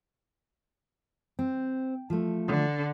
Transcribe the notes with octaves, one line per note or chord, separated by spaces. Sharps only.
C4
F3 A3
D3